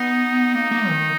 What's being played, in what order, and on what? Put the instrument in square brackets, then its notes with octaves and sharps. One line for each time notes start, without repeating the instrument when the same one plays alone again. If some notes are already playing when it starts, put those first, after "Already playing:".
Already playing: [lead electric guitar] B3 [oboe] D#4
[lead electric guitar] A#3 [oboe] D#4
[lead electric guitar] A#3
D#3